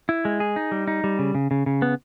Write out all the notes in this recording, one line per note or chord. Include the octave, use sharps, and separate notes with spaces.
E4
G#3
G#4
D#4
G3
D#4
G3
C#3
C#3
C#3
C#3
B3